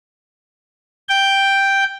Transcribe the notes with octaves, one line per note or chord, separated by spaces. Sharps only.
G5